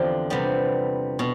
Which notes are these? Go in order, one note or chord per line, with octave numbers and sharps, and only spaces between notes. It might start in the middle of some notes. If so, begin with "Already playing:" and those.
Already playing: E2 D3 F3 C4 D4 F4 G4
C3 G3 B3
B2